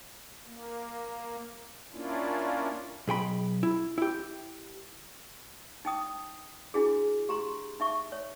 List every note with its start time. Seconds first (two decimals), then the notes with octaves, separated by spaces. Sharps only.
0.46 A#3
1.93 A#3 C#4 D4 E4 F4
3.08 B1 G#4 G5 B5
3.63 E4
3.98 E4 G4
5.85 D#4 G5 D#6
6.74 D4 E4 F#4 G#4
7.29 G4 A#5 C6
7.80 D#4 E5 C#6
8.12 C#5